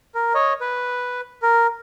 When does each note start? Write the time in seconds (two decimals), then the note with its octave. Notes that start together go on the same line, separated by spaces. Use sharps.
0.15 A#4
0.34 C#5 D#5
0.61 B4
1.42 A#4